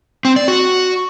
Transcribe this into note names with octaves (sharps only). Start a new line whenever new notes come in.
C4
D5
F#4